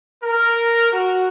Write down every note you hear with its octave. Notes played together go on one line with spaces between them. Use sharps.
A#4
F#4